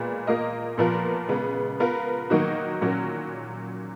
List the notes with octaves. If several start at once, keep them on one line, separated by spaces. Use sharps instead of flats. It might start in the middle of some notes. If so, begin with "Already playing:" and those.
Already playing: A#2 G#3 B3
A#3 F4 A#4 D#5
A#2 F3 B3 F4 A#4
C#3 G#3 B3
B3 F4 A#4
D#3 F#3 A#3 D#4 F#4
A#2 F#3 C#4 F#4 A#4